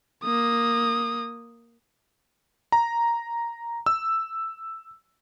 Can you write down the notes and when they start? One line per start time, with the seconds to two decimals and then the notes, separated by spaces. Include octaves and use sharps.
0.23 A#3 D#6
2.72 A#5
3.86 E6